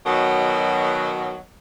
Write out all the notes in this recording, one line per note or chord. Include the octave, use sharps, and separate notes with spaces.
B2 D#3 F#3